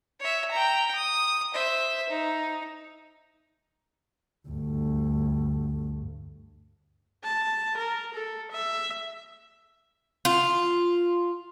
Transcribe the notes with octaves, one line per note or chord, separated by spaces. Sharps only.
C#5 E5
G5 A#5
D#6
C5 E5
D#4
D2 G2
A5
A#4
A4
E5
F4